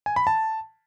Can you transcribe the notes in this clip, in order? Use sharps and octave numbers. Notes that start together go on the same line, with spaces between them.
G#5
B5
A5